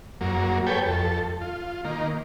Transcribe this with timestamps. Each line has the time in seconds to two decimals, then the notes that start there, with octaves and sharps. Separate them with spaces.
0.21 F#2 F#3 A#3
0.67 G4 A4 B4 C#5 G5 G#5
0.86 F2 A4
1.41 F4
1.85 D#3 A#3